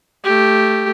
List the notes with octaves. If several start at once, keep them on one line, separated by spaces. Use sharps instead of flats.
A3 G4